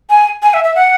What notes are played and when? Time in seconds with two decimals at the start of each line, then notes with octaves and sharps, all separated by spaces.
0.10 G#5
0.42 G#5
0.54 E5
0.64 E5
0.75 F#5